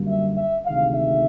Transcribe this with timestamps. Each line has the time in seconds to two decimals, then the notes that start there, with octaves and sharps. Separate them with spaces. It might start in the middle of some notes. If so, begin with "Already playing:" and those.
Already playing: F#2 D3 G3 A#3
0.08 E5
0.38 E5
0.66 D2 C3 D#3 G#3 F5
0.96 E5